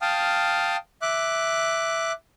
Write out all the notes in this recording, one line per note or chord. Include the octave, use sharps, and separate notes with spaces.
F5 G5 A5 D#6 F6
E5 D6 F#6